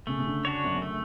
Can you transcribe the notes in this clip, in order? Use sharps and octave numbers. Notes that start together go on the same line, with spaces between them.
C#3 A3
C#3
D3
D4 F#4 C#5
F#2
F#2
A3